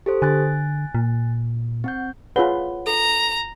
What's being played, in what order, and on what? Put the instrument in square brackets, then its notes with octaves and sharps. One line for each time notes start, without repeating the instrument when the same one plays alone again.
[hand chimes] G4 A4 C5
[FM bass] D3 [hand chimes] G#5 F#6 A6
[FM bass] A#2
[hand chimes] C4 F#5 G6
[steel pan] F4 G#4 B4 [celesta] C#5 F#5 G7
[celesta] A4 [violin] A#5